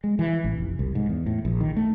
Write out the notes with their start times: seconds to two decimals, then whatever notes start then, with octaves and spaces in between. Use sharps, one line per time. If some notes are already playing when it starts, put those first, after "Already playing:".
0.04 G#3
0.19 E3
0.44 A1
0.58 F1
0.79 C2
0.95 G#2
1.09 E2
1.26 A2
1.45 A#1
1.61 D#3
1.77 A3